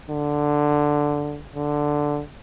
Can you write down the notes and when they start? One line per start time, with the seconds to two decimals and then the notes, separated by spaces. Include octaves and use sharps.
0.10 D3
1.56 D3